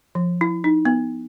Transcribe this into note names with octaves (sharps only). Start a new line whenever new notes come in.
F3
E4
D#4
B3